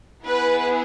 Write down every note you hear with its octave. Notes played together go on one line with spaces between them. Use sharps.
B3 E4 G#4 B4